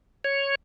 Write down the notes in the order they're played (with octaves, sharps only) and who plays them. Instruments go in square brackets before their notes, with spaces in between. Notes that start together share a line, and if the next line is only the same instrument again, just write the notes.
[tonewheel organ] C#5